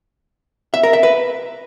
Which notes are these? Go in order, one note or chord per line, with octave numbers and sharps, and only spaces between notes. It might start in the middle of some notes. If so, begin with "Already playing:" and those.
E5
A#4
E5
B4